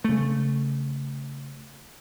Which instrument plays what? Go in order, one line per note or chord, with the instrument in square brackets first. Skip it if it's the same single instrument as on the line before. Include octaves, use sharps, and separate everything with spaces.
[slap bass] C#3 A3